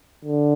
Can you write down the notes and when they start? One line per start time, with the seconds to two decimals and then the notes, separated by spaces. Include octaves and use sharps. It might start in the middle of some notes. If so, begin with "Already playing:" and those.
0.25 D3